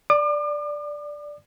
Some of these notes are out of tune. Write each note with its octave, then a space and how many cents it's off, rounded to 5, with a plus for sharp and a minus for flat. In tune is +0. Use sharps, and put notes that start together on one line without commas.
D5 +0 D6 +40